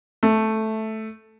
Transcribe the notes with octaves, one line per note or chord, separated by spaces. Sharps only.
A3